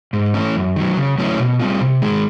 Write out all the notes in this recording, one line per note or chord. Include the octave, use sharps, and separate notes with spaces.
G#2
E3 A3 C#4
F#2
D#3 F#3
C#3
F#3 A3 C#4 E4
B2
G3 C4 F4
C3
D#3 G#3